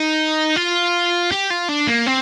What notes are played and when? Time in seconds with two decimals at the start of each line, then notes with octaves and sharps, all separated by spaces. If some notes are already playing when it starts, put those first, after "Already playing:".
Already playing: D#4
0.56 F4
1.31 G4
1.50 F4
1.69 D4
1.87 A#3
2.06 C4